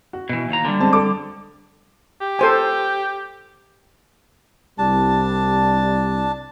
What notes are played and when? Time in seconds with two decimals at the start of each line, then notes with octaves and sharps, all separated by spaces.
0.13 F#4
0.29 B2 E3
0.50 D#2 A#5
0.65 D3 G3
0.80 G#3 C4 A5
0.93 A4 D6
2.21 G4
2.39 A4 C5 G#5
4.78 C2 G3 D4 A5